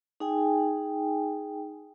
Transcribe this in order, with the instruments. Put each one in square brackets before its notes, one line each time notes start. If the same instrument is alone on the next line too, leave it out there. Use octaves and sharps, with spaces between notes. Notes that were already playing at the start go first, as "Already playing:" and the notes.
[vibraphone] D#4 G#4 G5 G#5